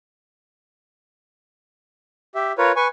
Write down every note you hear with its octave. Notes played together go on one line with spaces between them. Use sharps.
G4 E5
F4 A#4 B4 C#5
B4 G#5 C#6